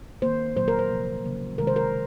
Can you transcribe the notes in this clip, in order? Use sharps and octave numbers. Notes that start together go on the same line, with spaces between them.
D#3 A#3 C5
A#2 F#3 A#3 C5
A#4
C5
C3 F3 A#3
C#3 F#3 A#3
C3 D#3 G#3 A#4
C5
A#4